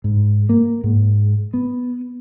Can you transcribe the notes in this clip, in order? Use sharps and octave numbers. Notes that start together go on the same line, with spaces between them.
G#2
A#3
G#2
B3